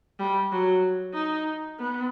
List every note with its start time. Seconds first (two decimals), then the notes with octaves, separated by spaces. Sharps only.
0.19 G3
0.52 F#3
1.14 D#4
1.79 B3